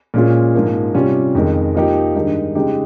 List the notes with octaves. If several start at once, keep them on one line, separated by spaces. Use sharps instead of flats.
A#2 G#3 C#4 F4
G#2 F3 A#3
C3 G3 C#4 F4
F2 D#3 G#3
F3 A#3 D#4 G4
G2 D#3 G#3 D#4
C#3 G#3 D#4 G4